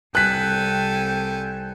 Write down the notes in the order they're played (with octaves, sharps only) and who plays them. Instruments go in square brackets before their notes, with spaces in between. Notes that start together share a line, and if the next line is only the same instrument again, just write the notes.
[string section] C2 [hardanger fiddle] A4 G#5 [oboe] G5 [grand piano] F#6 B6